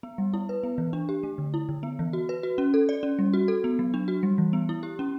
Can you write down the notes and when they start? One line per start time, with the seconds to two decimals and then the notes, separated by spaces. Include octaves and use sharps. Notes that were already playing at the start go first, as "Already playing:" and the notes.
0.03 B3
0.18 G3
0.34 E4
0.49 B4
0.64 B3
0.78 E3
0.93 D4
1.09 G4
1.23 A3
1.38 D3
1.54 E4
1.69 D3
1.83 B3
1.99 E3
2.13 F#4
2.29 B4
2.43 F#4
2.58 C#4
2.74 A4
2.89 D5
3.03 C#4
3.19 G3
3.34 F#4
3.48 A4
3.64 B3
3.79 F#3
3.94 D4
4.08 F#4
4.23 G3
4.38 E3
4.53 B3
4.69 E4
4.83 G4
4.99 C#4